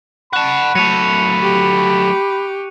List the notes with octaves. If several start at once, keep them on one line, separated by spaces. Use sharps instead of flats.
F#5 A5 B5 C#6 F#6
F#3 A3 C#7 D#7 F7
G4